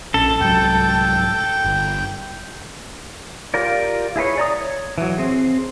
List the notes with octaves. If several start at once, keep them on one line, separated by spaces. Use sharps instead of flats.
A#1 C#4 A4
C2 G#2 F#3 G5
G1
F4 G4 A#4 D5
E4 G#4 B4 C#5
D5 A#5 D#6
C#5
E3 F#3
C4 G#4